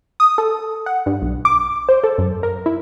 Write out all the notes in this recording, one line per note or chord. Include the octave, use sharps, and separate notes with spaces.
D#6
A4
F#5
G2
B1
D6
C5
A4
F#2
A#4
E4